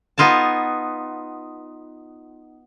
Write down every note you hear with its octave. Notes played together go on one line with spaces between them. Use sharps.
B3 D#4 F4 G#5 A5